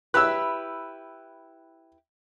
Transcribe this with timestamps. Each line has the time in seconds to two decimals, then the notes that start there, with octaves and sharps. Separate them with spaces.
0.14 E4 G4 B4 E6 F#6